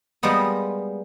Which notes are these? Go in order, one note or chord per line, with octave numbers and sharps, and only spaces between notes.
G3 G#3 A#3 B3 D#5